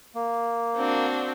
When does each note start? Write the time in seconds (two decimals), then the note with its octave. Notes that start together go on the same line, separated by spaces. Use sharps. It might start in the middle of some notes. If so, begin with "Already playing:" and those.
0.15 A#3
0.76 C4 D4 F#4